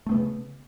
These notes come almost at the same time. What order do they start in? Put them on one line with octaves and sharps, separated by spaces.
A3 C4 B3 C#3